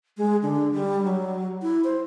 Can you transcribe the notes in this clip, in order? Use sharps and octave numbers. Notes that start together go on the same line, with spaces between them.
G#3
D3
G3
F#3
E4
C5